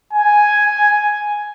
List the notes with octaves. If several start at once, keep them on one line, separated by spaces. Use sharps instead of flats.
G#5